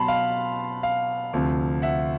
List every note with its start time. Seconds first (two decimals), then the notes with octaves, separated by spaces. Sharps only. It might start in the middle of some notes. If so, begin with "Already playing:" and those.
Already playing: B2 F#3 B3 A5 B5 C6
0.08 F5
0.83 F5
1.33 D2 C3 F3
1.82 E5 F#5